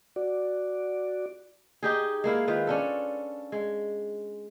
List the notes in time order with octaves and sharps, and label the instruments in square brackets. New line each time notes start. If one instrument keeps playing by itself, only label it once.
[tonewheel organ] F#4 D5
[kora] D#4 G4 G#4
G#3 A#3 E4 F5
D#3 F4 B4
C#4 D4 A4
G#3